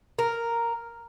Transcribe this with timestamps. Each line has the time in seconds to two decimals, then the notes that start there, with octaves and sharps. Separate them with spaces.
0.19 A#4